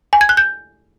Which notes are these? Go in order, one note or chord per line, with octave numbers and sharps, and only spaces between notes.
G#5
G#6
F#6
G6